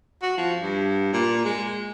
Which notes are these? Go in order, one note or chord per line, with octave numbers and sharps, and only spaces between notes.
F#4
F3
G2
A#2
G#3